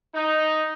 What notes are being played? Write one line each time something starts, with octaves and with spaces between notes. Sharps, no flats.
D#4